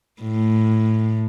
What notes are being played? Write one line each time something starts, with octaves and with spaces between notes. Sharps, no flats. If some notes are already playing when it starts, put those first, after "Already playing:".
A2